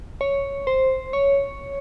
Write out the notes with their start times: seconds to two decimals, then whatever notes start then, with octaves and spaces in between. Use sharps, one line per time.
0.21 C#5
0.67 C5
1.13 C#5